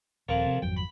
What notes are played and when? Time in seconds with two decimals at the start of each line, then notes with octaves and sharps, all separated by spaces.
0.29 D#1 F2 F3 A#4
0.47 C3
0.62 G#1 F2 F#3 G5
0.77 B5